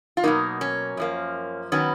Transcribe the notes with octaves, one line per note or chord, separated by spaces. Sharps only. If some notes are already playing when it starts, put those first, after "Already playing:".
F4
B2 F#3 A#3 D#4
C#4
F#2 F3 A#3
D#3 F#3 B3 C#4